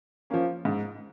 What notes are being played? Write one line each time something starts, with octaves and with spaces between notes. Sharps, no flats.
F3 A#3 C#4
G#2